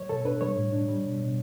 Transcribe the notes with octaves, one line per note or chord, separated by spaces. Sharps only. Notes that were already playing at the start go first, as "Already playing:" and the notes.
Already playing: F#3 C#5
B2 A4
D4 B4
G3 C#5
A2
D4
G3
B2
B2